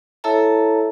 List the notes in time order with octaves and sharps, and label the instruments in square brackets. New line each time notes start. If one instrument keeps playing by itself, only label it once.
[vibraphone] E4 A4 C#5 E5 A5 A#5